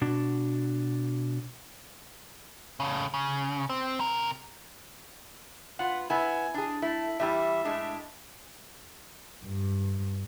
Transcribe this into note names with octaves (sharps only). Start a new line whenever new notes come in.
B2 D4 F#4
A2 C#3
C#3
C4
C3 A#4
B3 F4 F#5
B3 E4 G#5
D4 G#4
A3 E4
E2 G3 E4 E5
A2 G#3 D4
G2